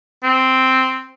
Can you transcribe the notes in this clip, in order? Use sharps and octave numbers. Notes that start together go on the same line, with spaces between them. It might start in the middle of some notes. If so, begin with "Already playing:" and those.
C4